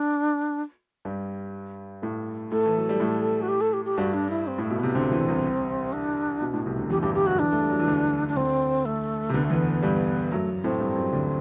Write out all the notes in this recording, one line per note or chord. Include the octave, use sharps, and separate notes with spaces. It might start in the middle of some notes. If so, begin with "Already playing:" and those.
Already playing: D4
G2 G3
A2 A3
A2 A3 A4
E3
F#3
G3
A2 A3
F#4
G4
A4
G4
G4
G2 G3 F#4
D4
E4
C4
A2 A3
B2
C3 B3
D2 D3 C4
E2 E3
C2 C3
D4
B2
A2
C2 C3
D2 D3
E2 E3 G4
G2 G3 G4
G3 G4
F#2 F#3 F#4
E2 E3 D4
A3
G3
F#3
E3
D2 D3
D4
D2 D3 C4
A3
C3
D2 D3 B3
A3
E2 E3 B3
G2 G3
F#2 F#3 A3
A2 A3 C4
G2 G3
F#2 F#3
D2 D3